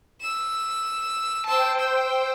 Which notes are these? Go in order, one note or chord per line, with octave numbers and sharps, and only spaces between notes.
E6 E7
C5 G5 A5 E6
E6